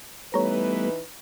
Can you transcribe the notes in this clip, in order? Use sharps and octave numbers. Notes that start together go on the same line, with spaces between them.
E3 G3 A3 B3 D#4 B4 C#5 A#5